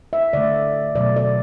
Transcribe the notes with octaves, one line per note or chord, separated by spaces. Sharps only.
E5
D3 A3 D5
B2 F#3 A3 D5
D5